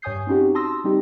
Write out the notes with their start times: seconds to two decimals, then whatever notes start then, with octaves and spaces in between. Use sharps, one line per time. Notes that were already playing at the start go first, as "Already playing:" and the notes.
0.02 G2 C#5 G#5 D#6 G6 C7
0.27 C4 C#4 D#4 F#4 G4
0.55 A5 C6 D#6 E6 A#6
0.84 G3 C4 D#4 G4